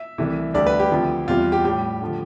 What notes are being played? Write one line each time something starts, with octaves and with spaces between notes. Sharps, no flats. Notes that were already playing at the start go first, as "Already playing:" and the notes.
Already playing: E5
C2 C3 E3 A3
D2 D3 G3 D5
B4
G4
D2 C3 F3 A3
E2 C3 G3 F4
G4
A2 G3 G4
D3 F3 A3